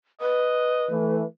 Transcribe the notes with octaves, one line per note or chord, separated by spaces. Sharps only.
B4 D#5
E3 A3